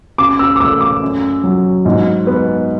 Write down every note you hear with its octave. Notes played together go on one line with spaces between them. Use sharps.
C#3 D6
E6
D6
A3 E6
D6
F#2
F#3
G#2
B3